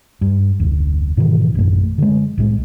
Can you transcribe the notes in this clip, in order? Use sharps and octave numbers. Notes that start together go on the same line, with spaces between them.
G2
F1 D2
G#2 B2 D#3 E3
A1 F#2 A3
D3 G#3
C2 A2 G#3